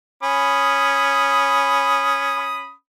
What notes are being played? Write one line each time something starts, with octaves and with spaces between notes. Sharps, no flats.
C#4 B5 D#6